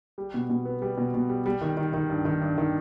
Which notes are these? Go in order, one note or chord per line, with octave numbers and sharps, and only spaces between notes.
G3
B2
B2
B3
G3
B2
B2
G3
G3
D#3
D#3
D#3
G2
D#3
G2
D#3